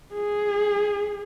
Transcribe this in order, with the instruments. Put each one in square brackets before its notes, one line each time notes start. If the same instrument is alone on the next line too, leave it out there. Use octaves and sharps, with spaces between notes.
[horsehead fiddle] G#4